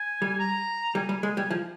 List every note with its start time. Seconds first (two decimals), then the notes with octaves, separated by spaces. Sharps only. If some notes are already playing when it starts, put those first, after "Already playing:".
Already playing: G#5
0.22 G3
0.39 A#5
0.95 G3 G#5
1.09 G3
1.23 G#3
1.37 G3
1.51 F3